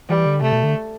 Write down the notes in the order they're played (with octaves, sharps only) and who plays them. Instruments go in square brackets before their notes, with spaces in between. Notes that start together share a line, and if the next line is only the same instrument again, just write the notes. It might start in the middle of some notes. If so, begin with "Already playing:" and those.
[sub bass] E3 [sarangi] G3
[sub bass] D3
[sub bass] C3 [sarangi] A3
[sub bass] B2
D3